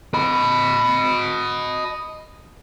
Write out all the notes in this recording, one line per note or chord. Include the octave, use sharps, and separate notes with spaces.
D#5 B5